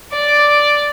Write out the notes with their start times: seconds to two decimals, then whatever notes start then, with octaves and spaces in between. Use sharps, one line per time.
0.12 D5